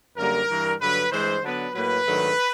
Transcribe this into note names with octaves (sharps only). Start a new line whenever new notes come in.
F#2 D3 G3 A#3 A#4
G2 E3 G3
G2 D3 F#3 B4
G2 E3 G#3 C5
D3 F#3 B3 D4 B4
A2 F#3 A#3 B4
G#2 D#3 F#3 A3 D4